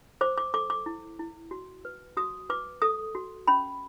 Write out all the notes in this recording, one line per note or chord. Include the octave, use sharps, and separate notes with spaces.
C5 D6
D6
A4 D6
D6
E4
E4
F#4
B4
F#4 D#6
B4 D6
A4 D#6
F#4
C#4 B5